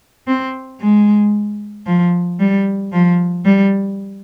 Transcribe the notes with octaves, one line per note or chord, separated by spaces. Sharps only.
C4
G#3
F3
G3
F3
G3